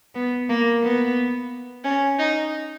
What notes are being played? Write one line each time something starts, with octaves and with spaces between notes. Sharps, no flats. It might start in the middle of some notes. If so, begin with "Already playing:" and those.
B3
A#3
B3
C#4
D#4